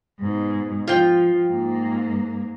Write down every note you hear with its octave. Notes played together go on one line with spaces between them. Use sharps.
G#2 B2
F3 F4 G5
G#2 A#3